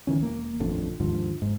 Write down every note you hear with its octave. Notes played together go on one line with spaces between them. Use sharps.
D#1 D#3 E3 C#4
E1 A#3
D#1 A1 F2 D3
D#2 G#2 D3 F3
G#2